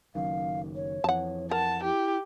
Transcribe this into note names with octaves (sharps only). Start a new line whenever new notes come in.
F#1 F#2 D#3 F5
C#5
F2 E3 F#5 A5
A#4 F#5 A5
E4 G4